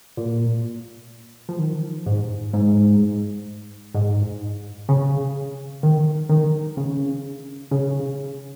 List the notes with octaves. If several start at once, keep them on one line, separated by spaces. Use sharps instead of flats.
A#2
F3
D#3
G#2
G#2
G#2
C#3
D#3
D#3
C#3
C#3